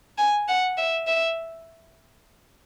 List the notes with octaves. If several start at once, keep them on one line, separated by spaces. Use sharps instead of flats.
G#5
F#5
E5
E5